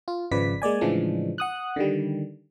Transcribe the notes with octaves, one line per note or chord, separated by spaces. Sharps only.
F4
G#1 C#3 F3 B4 D5 B6
G#3 A#3 D5 G#5
A2 C#3 E3 F3 G#3 D4
F#5 D#6 F#6
D3 D#3 G3